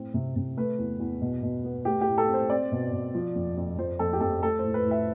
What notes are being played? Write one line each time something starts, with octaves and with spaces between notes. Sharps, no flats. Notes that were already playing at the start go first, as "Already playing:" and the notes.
Already playing: A2 C4
C3
C3
A3 B4
E2
E2
B2
B2
B3
A3 G4
G4
A2
A4
C4
C5
C4 D5
B2
B2
F3
F2
F2
F3 C5
F2 A4
G4
F2 A4
A3 A4
C5
A2
B4
A2
E5